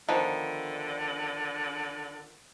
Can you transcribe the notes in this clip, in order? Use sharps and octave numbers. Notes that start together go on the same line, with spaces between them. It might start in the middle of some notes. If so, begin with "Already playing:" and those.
D3 D#3 F3 B3